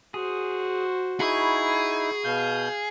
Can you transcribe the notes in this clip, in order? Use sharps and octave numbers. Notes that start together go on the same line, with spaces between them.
F#4 G#4 C5
D#4 E4 G#4 F#5 B5 C#6
B2 F5 G6